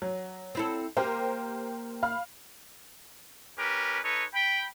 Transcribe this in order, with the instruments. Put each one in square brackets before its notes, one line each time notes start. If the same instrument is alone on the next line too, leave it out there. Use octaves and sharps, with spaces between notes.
[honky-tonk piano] F#3
[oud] C4 E4 A4
[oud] A#3 [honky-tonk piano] G4 A#4 C5
[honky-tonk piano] F5 B5 F6
[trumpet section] C#4 G4 A#4 B4
D#4 A4 B4 C#5
G5 B5